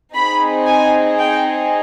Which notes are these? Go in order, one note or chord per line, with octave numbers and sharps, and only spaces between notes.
C4 D#4 G#4 B5
G#5
G5